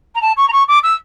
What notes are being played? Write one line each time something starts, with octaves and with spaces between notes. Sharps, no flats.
A#5
A5
C#6
A#5
C#6
D6
E6